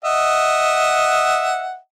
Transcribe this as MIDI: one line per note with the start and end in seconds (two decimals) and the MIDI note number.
0.05 1.77 75
0.05 1.77 76
0.05 1.77 78